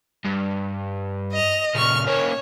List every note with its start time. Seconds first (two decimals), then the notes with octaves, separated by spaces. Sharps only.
0.25 G2
1.33 D#5 F7
1.75 A#2 C#3 C#6 F6
2.07 A#3 C#4 C#5